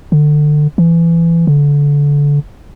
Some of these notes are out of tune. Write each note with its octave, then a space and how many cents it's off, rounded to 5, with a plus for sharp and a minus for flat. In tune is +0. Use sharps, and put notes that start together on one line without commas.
D3 +25
E3 +25
D3 -25